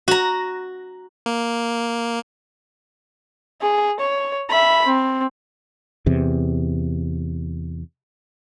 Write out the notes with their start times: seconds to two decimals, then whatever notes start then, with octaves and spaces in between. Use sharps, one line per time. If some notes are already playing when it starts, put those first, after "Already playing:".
0.08 F#4 A#5
1.26 A#3
3.61 G#4
4.00 C#5
4.50 E5 B5
4.86 C4
6.06 E2 C3